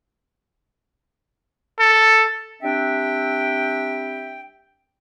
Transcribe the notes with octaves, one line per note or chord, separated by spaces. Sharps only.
A4
G3 C4 D4 E5 G5